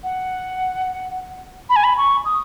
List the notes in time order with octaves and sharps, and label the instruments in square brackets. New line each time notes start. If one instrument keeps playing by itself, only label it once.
[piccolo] F#5
B5
G#5
B5
C#6
D#6